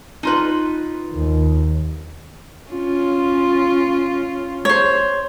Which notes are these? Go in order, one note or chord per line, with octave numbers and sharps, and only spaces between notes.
D#4 F4 B4
D#2
C#4 F4
C5 C#5